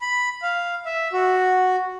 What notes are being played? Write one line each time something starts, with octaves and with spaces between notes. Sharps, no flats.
B5
F5
E5
F#4